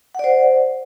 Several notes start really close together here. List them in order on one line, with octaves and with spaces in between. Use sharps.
F#5 D5 C5